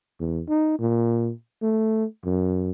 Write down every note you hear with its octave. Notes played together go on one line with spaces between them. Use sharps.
E2
D#4
A#2
A3
F#2